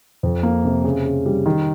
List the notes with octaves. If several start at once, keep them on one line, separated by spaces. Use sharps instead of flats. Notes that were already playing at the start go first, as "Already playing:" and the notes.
F2
A#3
C3
C#3
C#3
G3
D#3